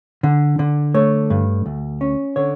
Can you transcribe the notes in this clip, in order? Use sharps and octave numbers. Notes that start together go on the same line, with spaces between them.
D3
D3
A3 C#5
G2
D2
C#4
D3 C#5